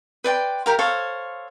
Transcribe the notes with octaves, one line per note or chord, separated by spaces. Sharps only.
B4 D5 G5 C6
G4 A#4 F5
A4 C5 C#5 F5